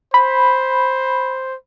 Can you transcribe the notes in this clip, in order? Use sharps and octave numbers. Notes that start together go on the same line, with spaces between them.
C5 B5